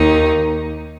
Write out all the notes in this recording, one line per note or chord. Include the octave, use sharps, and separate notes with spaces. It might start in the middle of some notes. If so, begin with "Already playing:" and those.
Already playing: D#2 D#4